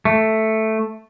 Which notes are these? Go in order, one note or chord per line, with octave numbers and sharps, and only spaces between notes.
A3